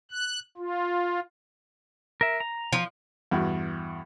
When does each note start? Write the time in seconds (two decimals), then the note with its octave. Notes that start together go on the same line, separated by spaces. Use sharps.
0.11 F#6
0.57 F4
2.21 A#4 E5
2.40 A#5
2.73 F3
3.31 E2 G2 F#4